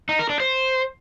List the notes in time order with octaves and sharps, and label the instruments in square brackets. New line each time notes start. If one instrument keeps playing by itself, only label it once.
[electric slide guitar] D#4
A#4
D4
C5